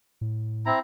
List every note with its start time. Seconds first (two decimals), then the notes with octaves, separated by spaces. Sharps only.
0.21 A2
0.66 C4 E4 A#5